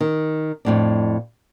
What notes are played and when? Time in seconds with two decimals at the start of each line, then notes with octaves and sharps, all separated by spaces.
0.01 D#3
0.65 F2 A2 D4